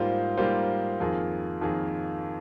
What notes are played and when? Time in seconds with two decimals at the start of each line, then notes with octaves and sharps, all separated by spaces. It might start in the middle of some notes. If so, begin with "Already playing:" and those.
Already playing: G#2 G3 A#3 F4 C5
0.37 G#2 G3 A#3 F4 C5
1.00 F2 D#3 A#3 F4 G#4
1.61 F2 D#3 A#3 F4 G#4